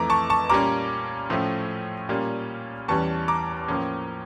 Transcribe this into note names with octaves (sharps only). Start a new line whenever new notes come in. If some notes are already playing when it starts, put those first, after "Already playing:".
Already playing: F2 E3 A3 A#5 D6
A5 C#6
A5 C#6
A#2 G3 A#3 C#4 A#5 D6
A2 F3 A3 C#4
A#2 G3 A#3 C#4
E2 E3 G3 C#4 A5 C#6
A#5 D6
A2 F3 A#3 C#4